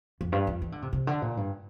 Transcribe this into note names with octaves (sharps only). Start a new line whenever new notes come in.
F2
G2
F2
E3
D3
C3
C3
D3
A#2
G2